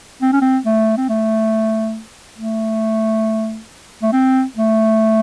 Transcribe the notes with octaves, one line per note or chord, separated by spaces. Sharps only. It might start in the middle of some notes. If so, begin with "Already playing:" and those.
C4
C#4
C4
A3
C4
A3
A3
A3
C4
A3